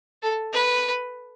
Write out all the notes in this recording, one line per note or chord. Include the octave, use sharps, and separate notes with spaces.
A4
B4